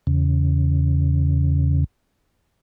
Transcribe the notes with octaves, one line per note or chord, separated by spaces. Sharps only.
E2 C#3